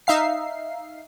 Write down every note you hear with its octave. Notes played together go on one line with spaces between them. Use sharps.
D#4 E5 F5 C7